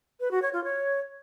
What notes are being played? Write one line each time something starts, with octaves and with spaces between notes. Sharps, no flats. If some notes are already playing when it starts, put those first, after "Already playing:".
B4
F#4
C#5
F4
C#5